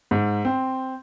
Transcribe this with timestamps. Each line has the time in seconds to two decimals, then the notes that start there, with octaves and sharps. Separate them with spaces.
0.11 G#2
0.45 C4